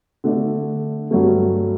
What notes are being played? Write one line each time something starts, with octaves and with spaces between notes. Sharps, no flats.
D3 A3 D4
G2 F#3 A3